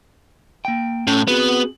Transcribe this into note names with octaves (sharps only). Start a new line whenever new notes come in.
A#3 G5
A2 C#4
B3 C4 F#4 G#4